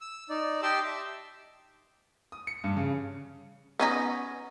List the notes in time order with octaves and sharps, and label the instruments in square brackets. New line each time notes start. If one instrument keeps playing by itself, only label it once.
[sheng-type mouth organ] E6
D#4 D5
G4 D#5 G5 A5 C6 E6
E5
[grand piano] D#6
C#7
G2
C#3
[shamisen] B3 C#4 D#4